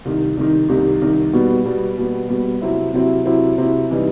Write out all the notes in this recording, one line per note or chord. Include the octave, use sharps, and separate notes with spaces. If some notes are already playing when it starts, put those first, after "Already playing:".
C2 C3 D#3
C2 C3 D#3
C2 C3 D#3
C2 C3 D#3
B2 G3 B3
B2 G3 B3
B2 G3 B3
B2 G3 B3
C3 F#3 C4 E4
C3 F#3 C4 E4
C3 F#3 C4 E4
C3 F#3 C4 E4
C3 E3 G3 D#4